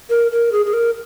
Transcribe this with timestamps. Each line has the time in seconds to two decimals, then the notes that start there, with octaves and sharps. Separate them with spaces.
0.10 A#4
0.31 A#4
0.52 G#4
0.66 G#4
0.73 A#4